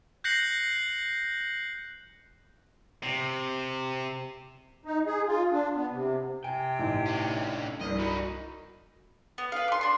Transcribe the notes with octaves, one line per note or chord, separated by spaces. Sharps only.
F#6 G6 A#6 C7 C#7 F#7
C3
D#4
G#4
F4
D4
B3
C3
C3 G5 G#5
A1 D#4
D3 C#4
C2 G2 D#5
E3 D#4 F#4 B5
B3
B4 F5
C6 D6
D4 C6